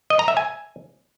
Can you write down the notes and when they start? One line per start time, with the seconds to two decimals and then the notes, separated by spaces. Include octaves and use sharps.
0.10 D#5
0.19 A#5
0.28 E5
0.37 G#5